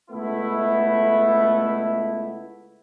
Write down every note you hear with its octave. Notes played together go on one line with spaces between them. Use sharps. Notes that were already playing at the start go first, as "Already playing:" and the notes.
C#2 A3 B3 E4